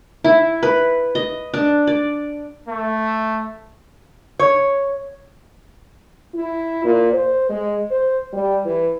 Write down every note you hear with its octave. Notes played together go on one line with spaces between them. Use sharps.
E4
B4
D#5
D4
D5
A3
C#5
E4
A#2
C5
G#3
C5
G3
E3